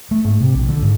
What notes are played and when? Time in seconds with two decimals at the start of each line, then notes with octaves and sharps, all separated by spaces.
0.11 A3
0.25 G#2
0.41 C3
0.55 A#1
0.68 D3
0.82 G#2